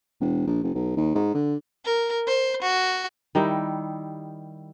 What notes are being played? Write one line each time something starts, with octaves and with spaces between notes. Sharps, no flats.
E1
A#1
F#1
B1
D#2
G#2
D3
A#4
C5
F#4
D#3 G3 D#4 E4